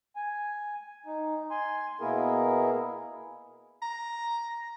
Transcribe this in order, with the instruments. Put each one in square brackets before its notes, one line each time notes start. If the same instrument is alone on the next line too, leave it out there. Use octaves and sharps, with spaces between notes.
[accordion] G#5
D#4
G#5 C6
B2 A#3 B3 E4 G#4 A#4
[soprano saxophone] A#5